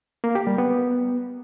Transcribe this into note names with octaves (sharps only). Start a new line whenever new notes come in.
A#3
G4
G3
B3